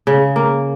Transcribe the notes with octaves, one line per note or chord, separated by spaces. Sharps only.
C#3
A#3